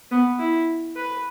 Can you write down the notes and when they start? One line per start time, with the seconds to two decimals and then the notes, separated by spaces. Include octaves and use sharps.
0.11 B3
0.39 E4
0.96 B4